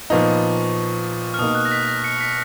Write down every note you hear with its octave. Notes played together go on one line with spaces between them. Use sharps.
A#2 F3 B3 D#4 C#6
F6
B2 A#3 D#4 D#6
F#6
A#6
B6
A#6
C#7
B6